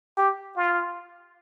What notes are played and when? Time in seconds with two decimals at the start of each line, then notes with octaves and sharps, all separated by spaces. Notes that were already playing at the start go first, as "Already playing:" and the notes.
0.17 G4
0.56 F4